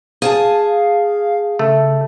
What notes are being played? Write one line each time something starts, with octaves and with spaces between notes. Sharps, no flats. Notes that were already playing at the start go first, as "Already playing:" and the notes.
G#4 F5 G#5 A5
C#3 A3